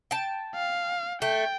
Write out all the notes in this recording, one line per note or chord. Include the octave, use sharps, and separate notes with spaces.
G5 A5
F5
A3 G5